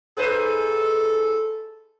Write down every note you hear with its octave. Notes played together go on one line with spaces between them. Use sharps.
G#2 A4 B4 C5